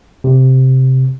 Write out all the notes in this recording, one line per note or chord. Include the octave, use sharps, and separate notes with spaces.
C3